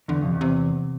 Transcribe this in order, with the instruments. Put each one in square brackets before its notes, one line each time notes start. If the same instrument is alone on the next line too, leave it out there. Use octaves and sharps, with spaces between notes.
[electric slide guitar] E2 [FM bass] D3
[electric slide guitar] F2 [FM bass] C3
[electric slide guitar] E2
[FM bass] C3